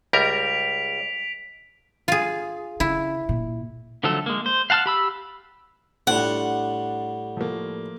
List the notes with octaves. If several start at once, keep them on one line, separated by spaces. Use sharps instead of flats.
C#2 G3 A#4 B6 D7 F7
F4 G#4
C#3 E4
A#2
D3 F3 F#3 A3 A4
G#3 A#3
C5
F5 F#5 A5 C6 F6
G4 B5 E6
A2 G3 D4 F4 F#5
F3 A3 A#3